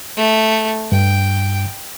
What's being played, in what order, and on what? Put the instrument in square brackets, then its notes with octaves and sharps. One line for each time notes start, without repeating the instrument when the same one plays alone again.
[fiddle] A3
[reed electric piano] G2 [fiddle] G5